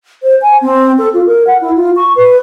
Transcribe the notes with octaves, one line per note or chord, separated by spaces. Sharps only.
C5
G#5
C4
A4
F4
A#4
F#5
E4
F4
C#6
B4